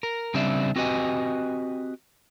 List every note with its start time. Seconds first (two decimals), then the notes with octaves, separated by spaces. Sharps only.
0.03 A#4
0.34 C#3 G3 C4 D4 E5
0.76 C4 F#4 G4 B4 D#5 G#5